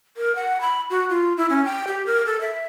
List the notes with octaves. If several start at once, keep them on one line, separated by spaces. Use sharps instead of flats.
A#4
F#5
B5
F#4
F4
E4
C#4
G5
G4
A#4
A4
E5